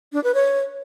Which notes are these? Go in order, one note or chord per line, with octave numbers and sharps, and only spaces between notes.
D4
B4
C#5